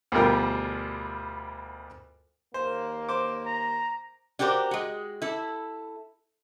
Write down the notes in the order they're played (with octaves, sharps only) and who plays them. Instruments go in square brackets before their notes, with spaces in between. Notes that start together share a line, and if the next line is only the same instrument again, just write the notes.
[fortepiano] D2 B2 G3 F4 A#4 G5
[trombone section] D#2 A#3 [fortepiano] C5
[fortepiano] C5 D6
[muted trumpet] A#5
[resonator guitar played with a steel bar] D4 F#4 G4 A#4 C5
G#3 F#4
E4 A4